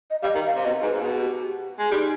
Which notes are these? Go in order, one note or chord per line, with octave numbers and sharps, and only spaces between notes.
D#5
G3 F5
D#5
D#3
F5
C3
B2 D#5
G#2 B4
G#2
B2 G#4
G4
G#3
G3 D#4